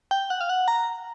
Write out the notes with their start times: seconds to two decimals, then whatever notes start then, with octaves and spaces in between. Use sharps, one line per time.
0.11 G5
0.30 F#5
0.41 F5
0.49 F#5
0.68 A#5